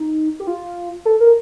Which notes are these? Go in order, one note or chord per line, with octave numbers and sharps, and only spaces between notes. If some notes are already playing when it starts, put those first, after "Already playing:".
Already playing: D#4
G4
F4
A4
A#4